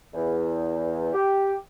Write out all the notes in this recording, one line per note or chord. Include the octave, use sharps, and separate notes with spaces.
E2
G4